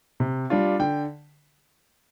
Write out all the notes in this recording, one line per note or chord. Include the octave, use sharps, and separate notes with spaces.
C3
G3 D4 F4
D3 G5